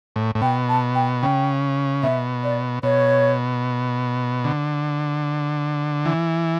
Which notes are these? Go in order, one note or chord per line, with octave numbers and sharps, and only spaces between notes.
A2
A2
B2 G5
A5
G5
C#3 G5
B2 E5
D5
B2 C#5
D3
E3